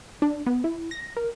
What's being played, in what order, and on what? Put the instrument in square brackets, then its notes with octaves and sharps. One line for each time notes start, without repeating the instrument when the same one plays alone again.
[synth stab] D4
B3
E4
A#6
A#4